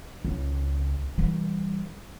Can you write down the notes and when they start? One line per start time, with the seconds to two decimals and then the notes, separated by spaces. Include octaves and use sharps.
0.25 C#2
1.18 E3 G3